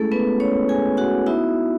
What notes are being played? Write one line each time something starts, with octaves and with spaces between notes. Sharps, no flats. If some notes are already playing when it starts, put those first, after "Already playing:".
Already playing: G#3 A3 C#4 E4 G#4 A4
B3 B4
C#4 C#5
G#4 G#5
F#4 F#5
B3 D#4 E4 F#4 E5